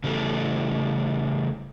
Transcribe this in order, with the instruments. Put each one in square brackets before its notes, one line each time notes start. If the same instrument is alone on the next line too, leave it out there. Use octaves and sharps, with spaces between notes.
[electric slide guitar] C#3 E3 G3 A3